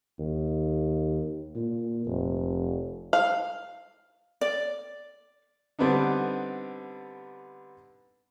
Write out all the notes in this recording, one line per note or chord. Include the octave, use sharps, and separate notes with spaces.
D#2
A#2
F1
F5
D5
D3 G3 B3 C4 D4 D#4